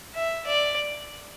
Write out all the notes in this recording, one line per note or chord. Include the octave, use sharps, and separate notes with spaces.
E5
D5